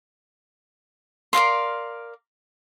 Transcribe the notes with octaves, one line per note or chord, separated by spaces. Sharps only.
A#4 D5 F5 C6